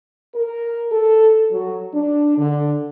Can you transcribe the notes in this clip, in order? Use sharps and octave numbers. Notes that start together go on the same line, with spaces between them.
A#4
A4
F#3
D4
D3